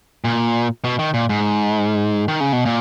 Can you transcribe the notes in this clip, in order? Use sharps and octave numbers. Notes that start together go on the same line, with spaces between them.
A#2
B2
D#3
A#2
G#2
D#3
C#3
B2
A#2